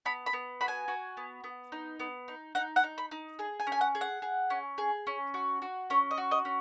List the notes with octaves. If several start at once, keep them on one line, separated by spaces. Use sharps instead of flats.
B3 B5
B5
B3
F#4 B5
G#5
F#4
B3
B3
D#4
B3
D#4
D#4 F#5
F#5
D#4
B5
D#4
G#4
G#5
C#4
G#5
F#5
G#4
F#5
G#4
C#4
G#4
C#4
F#4
F#4
C#4 C#5
D#5
F#4
D#5
C#4